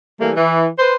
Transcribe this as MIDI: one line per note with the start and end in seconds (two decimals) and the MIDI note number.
0.20 0.31 52
0.20 0.31 55
0.20 0.31 57
0.20 0.31 58
0.36 0.66 52
0.79 0.94 71
0.79 0.94 72